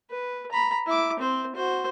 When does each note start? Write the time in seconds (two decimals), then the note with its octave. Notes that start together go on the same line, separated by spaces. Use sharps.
0.10 B4
0.52 A#5 B5
0.86 E4 D6
1.19 C4 C5
1.55 F#4 C5